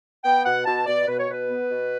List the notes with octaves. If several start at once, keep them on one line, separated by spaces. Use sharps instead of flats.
B3 G5
B2 F#5
B2 A5
B2 D5
B2 B4
C#5
B2 B4
B3
B2